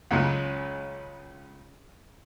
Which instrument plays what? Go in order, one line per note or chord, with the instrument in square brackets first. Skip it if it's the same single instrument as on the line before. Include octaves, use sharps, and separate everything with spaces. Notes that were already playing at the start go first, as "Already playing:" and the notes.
[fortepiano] C#2 C#3 F#3 G#3